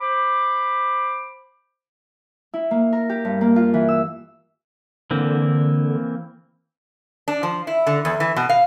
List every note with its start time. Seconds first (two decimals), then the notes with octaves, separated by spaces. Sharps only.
0.01 C5 B5 D6
2.53 E4
2.71 A#3
2.93 A#4
3.09 G4
3.25 G2
3.41 A#3
3.56 F4
3.74 E3
3.89 E6
5.11 D3 E3 A#3 C4
7.28 D4
7.43 F3
7.67 E4
7.87 D3
8.05 E2
8.20 E3
8.36 B2
8.49 F5